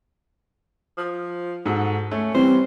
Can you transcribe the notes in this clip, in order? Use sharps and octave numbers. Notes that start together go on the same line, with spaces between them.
F3
G#2 F#4 A4
A3 C#4
E3 G3 C4 C#4 C5